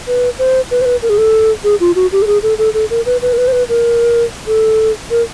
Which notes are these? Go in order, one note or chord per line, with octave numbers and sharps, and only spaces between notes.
B4
C5
B4
C5
B4
A#4
G#4
A4
G#4
F4
F#4
G4
A4
G#4
A4
A4
A4
A#4
B4
B4
A#4
B4
C5
B4
A#4
A4
A#4